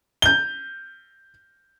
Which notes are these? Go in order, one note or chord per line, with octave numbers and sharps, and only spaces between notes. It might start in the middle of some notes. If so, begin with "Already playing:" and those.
G6 G7